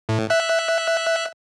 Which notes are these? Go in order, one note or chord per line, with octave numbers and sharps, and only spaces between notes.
A2
E5 F#6